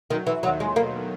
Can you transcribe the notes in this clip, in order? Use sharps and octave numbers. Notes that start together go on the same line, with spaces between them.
F#2 D#3 F#3
E3
D#2 D#3 F#3
G#3
B2 A#3